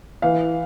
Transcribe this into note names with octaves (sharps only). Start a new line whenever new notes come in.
E3 F5